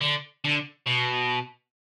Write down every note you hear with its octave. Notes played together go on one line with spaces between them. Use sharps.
D3
D3
B2